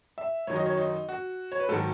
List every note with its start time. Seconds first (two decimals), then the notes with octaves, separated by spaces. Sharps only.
0.18 E5
0.47 F#2 D#3 F#3 C#5
0.56 D#5
0.66 C#5
0.77 D#4
1.09 F#4
1.52 C#5
1.60 B4
1.69 G#2 D#3 F#3 A4